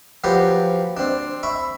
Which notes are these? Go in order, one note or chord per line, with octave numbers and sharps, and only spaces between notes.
F3 F#3 G4 B4
C4 D4
E5 B5 C#6